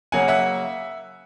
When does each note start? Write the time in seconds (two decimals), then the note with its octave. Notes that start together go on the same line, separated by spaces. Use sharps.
0.12 C#3 F#3 A#3 C#4 F#5 G#5
0.28 E5 F#5